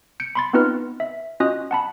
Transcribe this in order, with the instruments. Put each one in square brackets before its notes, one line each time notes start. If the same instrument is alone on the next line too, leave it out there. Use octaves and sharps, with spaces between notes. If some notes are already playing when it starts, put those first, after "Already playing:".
[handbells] G6 C#7 D7
B5 C6 A6
B3 C4 D#4 F4 B4 F6
E5
C#4 F4 F#4 D#5 D#6 F#6
F#5 A5 B5